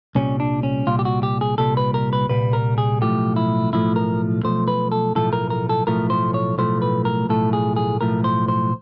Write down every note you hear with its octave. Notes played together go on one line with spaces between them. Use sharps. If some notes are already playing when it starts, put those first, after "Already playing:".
C2 A#2 G3 C#4
D4
C#4
C2 A#2 G3 F4
G4
F#4
G4
G#4
C2 A#2 G3 A4
B4
A#4
B4
C2 A#2 G3 B4
A#4
G#4
B1 A2 F3 A3 G4
E4
B1 A2 F3 A3 E4
A#4
B1 A2 F3 A3 C5
B4
A4
B1 A2 F3 A3 A4
A#4
A#4
A4
B1 A2 F3 A3 A#4
C5
C#5
B1 A2 F3 A3 C5
B4
A#4
B1 A2 F3 A3 A4
G#4
G#4
B1 A2 F3 A3 A#4
C5
C5